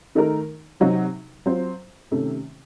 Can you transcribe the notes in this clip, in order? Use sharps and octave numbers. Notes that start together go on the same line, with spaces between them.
D#3 A3 D#4 A#4
C3 F#3 C4 D#4 F#4
F#3 C4 F4 C5
C3 D#3 A3 C#4